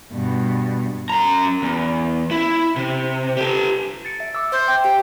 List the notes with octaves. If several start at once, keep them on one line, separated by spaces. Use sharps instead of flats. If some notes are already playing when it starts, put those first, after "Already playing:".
G2 B2
F#2 A#5
E2
E4
C3
G4 A4
A6 C#7 D7
E5
D6 E6
C5 E5
G5
G4 G5